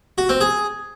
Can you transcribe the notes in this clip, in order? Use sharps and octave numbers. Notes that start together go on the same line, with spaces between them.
F#4
C4
G#4